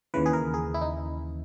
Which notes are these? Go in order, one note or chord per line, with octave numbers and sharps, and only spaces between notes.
D#2 C#3 E3 B4
G#4
A#4
G#4
E4
D#4